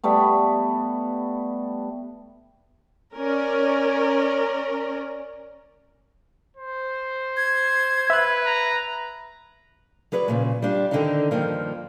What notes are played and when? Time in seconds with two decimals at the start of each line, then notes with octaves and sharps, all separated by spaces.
0.04 G3 A3 B3
3.15 C#4 A#4 D5
6.57 C5
7.37 G#6
8.10 B4 E5 F#6
8.46 A#5
10.12 F#3 G#4 B4 D5
10.28 A#2 C#3 F3
10.62 G3 D4 F4
10.91 D3 D#3 C4 D4 D#4
11.31 G2 D#3 F3 A#3